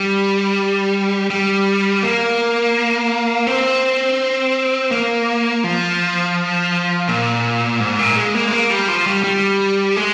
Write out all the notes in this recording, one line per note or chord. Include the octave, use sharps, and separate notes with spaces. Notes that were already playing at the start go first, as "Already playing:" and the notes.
Already playing: G3
G3
A#3
C4
A#3
F3
A#2
G#2
A#2
G#3
A#3
G#3
A#3
G3
F3
G3
G3
G#3